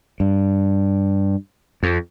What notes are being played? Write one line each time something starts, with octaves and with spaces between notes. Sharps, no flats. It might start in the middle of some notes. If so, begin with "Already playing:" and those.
G2
F2